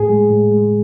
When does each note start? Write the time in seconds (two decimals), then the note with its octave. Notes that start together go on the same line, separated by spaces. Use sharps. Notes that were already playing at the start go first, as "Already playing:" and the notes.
Already playing: A2 G#4
0.09 G#3
0.30 A2
0.51 G#3